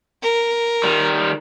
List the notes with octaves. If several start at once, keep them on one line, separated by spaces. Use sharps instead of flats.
A#4
D#3 G3